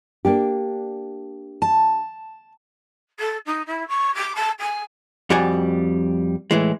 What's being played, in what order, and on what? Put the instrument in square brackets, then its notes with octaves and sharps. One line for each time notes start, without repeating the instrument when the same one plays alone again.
[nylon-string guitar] A#3 D4 G4
[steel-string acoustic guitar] A5
[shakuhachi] A4
D#4
E4
C#6
D6
A5
G#5
[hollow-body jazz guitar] F2 G3 F#4 D5 G#5
A2 E3 G#3